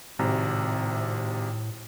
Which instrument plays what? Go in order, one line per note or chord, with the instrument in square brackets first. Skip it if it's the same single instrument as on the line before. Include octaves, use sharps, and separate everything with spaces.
[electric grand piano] G#1 C3 A#5 [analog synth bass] A2